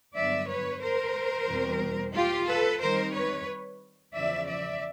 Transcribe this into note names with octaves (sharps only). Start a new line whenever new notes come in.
G2 D3 F#3 B3 D5 E5
B4 C#5
A#4 C5
E2 B2 G3 C4
F4 G4
A4 B4
D#3 G3 C4 D#4 A#4 C5
B4 C#5
E2 C#3 F3 D5 E5
D5 E5